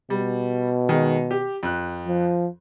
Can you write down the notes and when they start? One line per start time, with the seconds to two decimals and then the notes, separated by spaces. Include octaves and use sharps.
0.10 B2 G3
0.89 D#3 G#3
1.31 G4
1.63 F2 F#6
2.07 F3